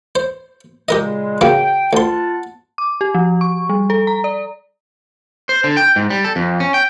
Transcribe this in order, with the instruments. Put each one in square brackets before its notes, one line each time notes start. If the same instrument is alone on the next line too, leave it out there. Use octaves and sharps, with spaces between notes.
[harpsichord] C5
[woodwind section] A#2 C#3 G#3 [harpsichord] G4 A#4 D#5
[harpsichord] C#3 F#3 A#3 [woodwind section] G5
[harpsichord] D2 C6 [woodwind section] F4 F#5 A5
[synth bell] D6
G4
F3
C#6
G3
A4
A#5
D5
[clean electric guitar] C5
D3
G5
G#2
G3
A4
F2
C#4
G5